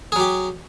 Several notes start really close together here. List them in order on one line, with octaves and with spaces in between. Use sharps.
G#4 F#3 G4